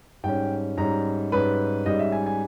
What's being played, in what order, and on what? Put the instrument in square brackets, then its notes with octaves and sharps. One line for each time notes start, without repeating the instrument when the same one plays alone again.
[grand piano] G#2 G3 C#4 G5
G#2 G3 C#4 A#5
G#2 G3 C#4 B4
G#2 G3 C#4 D#5
E5
G#5
G#5